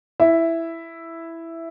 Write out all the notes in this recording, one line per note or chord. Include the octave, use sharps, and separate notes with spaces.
E4 E5